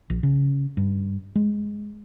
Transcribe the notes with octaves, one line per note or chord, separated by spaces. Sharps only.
A#1
C#3
G2
G#3